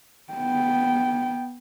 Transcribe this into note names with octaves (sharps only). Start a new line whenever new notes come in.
B3 G5